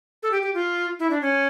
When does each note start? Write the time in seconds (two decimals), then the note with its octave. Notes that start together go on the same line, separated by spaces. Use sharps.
0.23 A4
0.31 G4
0.42 G4
0.54 F4
0.99 E4
1.10 D4
1.22 C#4